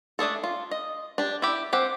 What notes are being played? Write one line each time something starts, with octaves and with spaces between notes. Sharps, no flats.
A3 D4 G#4 A4
F4
D#5
D4 G4
E4 G4
C4 G4 F#5